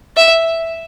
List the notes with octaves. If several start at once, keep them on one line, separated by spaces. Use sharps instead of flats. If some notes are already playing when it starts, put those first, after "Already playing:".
E5